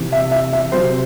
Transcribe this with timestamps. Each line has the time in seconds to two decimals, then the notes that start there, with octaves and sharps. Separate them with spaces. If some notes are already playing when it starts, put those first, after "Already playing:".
Already playing: C3 E3
0.12 E5
0.31 E5
0.53 E5
0.72 C3 F#3 C5